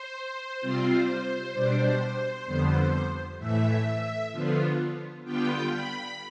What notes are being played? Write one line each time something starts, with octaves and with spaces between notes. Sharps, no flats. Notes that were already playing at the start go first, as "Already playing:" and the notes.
Already playing: C5
C3 G3 C4 F4
B2 G3 D4
F2 D3 G3 B3
A2 E3 A3 E5
D3 F3 B3 F4
D3 G3 B3 F4 G5
B5